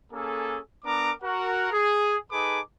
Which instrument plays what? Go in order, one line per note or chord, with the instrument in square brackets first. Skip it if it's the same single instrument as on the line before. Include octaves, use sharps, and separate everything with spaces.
[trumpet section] A#3 C#4 G#4 A4
B3 D4 A#4 A#5 D6
F#4 A#4 F#5
G#4
D#4 G#4 A4 B4 B5 D6